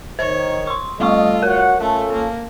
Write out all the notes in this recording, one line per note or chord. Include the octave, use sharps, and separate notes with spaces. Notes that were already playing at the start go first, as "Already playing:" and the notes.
D#3 C5 C#5
C6 C#6
G3 A3 F4 A4 D5 D#5 C#6
F#4 A#4 C#5 F#5
A3 C#4 F4 A4
A#3